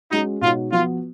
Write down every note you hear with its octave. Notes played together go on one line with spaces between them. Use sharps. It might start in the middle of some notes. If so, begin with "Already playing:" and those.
G#3 C#4 D#4 F#4
B2 G#3 D#4 F4 F#4 C#5
F3 B3 F4 F#4